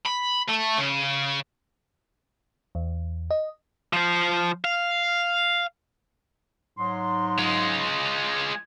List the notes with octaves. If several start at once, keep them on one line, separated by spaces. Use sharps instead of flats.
B5
A3
C#3
E2
D#5
F3 C5
F5
G#2 F#3 C6
G#3 F4